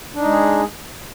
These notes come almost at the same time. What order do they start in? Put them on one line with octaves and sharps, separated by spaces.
D4 D#4 G#3 G#4